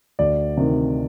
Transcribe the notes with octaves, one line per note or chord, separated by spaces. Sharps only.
D2 D5
C3 D#3